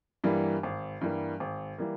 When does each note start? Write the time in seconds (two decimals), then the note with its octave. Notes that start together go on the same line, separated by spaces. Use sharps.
0.24 G2 E3 G3 A#3
0.63 G#1
1.01 G2 E3 G3 A#3
1.40 G#1
1.78 E3 G3 A#3